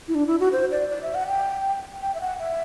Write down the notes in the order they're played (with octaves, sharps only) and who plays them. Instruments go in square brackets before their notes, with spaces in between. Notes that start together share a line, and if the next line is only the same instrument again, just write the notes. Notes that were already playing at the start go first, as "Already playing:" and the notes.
[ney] E4
D4
E4
F#4
C5
D5
D5
E5
F#5
G5
G5
E5
F#5
E5